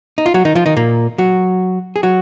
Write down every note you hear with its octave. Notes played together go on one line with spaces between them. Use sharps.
D#4
F4
F#3 F#4
D#3 D#4
F3 F4
D#3 D#4
A#2 A#3
F#3 F#4
G#4
F#3 F#4